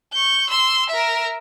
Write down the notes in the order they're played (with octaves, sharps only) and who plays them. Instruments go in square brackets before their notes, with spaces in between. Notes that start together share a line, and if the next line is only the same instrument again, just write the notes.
[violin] C#6 G6
C6 E6
A#4 E5